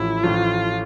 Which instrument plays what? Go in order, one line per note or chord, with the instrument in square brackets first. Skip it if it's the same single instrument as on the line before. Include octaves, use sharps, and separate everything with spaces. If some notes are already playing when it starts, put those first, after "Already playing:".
Already playing: [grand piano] A1 A2 F3 [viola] E4
[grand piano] A1 A2 F3 [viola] F4